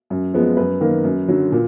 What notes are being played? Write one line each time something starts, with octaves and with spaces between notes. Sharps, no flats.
F#2
F3 G#3 B3
F#2 B4
D#3 A#3
F#2
D3 F#3
A#2